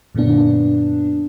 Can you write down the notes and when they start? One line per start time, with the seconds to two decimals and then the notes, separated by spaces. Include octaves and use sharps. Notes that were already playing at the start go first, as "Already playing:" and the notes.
0.15 F#2 A#2 D3 B3 D4